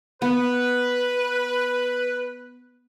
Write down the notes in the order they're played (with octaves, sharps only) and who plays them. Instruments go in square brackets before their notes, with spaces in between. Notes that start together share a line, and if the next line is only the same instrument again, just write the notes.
[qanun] B3 [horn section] B4